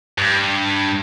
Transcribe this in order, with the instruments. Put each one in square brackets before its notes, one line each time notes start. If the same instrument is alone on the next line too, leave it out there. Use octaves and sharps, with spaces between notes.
[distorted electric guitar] G2